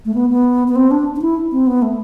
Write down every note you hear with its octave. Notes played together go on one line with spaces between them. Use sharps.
A3
B3
B3
B3
C4
D4
D4
E4
C4
B3
A3